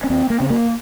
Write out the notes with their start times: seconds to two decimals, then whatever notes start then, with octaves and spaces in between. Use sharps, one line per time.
0.04 C#4
0.10 D#2 C4
0.30 A#3
0.40 C#3 C4
0.50 A#3